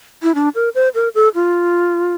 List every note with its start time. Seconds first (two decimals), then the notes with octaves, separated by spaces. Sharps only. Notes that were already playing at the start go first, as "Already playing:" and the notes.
0.23 E4
0.35 D4
0.55 A#4
0.75 C5
0.95 A#4
1.15 A4
1.35 F4